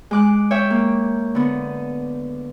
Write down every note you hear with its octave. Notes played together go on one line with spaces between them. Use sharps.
G#3 D6 F#6
C#5 E5 G5
A#3
D3 B3